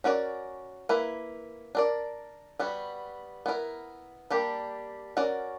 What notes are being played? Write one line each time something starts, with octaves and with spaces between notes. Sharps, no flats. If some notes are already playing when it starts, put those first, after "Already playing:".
C#4 F#4 A#4 D5
A#3 E4 B4
D4 A#4 D5
G3 B3 F#4
B3 E4 A#4
G3 A#3 D4 G4
C#4 F#4 A#4 D5